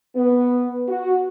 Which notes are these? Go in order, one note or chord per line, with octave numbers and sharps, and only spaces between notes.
B3
F#4